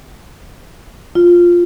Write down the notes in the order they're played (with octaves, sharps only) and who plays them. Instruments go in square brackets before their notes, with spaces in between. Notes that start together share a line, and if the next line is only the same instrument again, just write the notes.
[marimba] F4